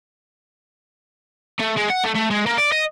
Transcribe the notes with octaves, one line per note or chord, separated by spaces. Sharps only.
A3
G#3
F#5
A3
A3
G#3
A#3
D5
D#5